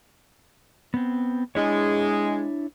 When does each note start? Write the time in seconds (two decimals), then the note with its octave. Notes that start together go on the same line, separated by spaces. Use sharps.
0.94 B3 C4
1.55 G#3 D4 E4 C#5